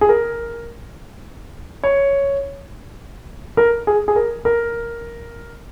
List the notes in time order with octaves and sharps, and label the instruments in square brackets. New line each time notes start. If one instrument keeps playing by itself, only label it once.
[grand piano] G#4
A#4
C#5
A#4
G#4
G#4
A#4
A#4